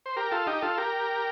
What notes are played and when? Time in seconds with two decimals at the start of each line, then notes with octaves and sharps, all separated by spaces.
0.06 C5
0.16 G4 A#4
0.31 F4 A4
0.47 D#4 G4
0.62 F4 A4
0.77 G4 A#4